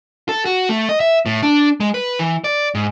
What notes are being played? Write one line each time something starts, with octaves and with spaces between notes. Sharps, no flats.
A4
F#4
A3
D#5
E5
A2
D4
G#3
B4
E3
D5
G#2